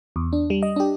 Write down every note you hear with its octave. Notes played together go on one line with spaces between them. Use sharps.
E2
D4
G3
D#5
D4 G4